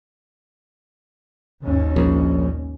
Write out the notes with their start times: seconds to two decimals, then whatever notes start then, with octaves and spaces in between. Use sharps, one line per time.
1.64 G#1 D#2 C#4
1.96 A#1